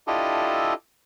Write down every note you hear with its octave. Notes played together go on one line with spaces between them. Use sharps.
D4 E4 F4 G4 A4 D#5